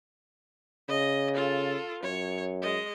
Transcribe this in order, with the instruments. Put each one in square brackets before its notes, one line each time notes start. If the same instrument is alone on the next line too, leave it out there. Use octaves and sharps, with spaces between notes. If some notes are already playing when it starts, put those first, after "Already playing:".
[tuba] C#3 [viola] D#5
[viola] F4 A4
[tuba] F#2 [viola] C#5
[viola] G#3 D#5